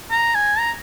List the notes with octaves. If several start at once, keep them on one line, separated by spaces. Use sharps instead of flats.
A#5
G#5
A#5